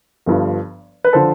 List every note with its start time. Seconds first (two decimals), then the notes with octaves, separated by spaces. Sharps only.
0.26 G1 G2 F3
1.04 B4
1.13 D3 F3 A4 C5